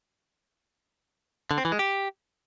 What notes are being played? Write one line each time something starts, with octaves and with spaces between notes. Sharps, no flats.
D3
C4
E3
G#3
G4